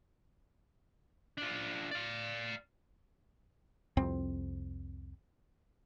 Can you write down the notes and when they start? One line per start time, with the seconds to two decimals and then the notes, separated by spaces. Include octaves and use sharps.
1.38 D4 F4
1.91 D5 F5
3.97 C2 F2 C4